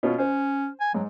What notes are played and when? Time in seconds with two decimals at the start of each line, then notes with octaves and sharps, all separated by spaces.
0.03 B2 C#4 F4
0.18 C#4 C5
0.81 G#5
0.94 G#2 F#3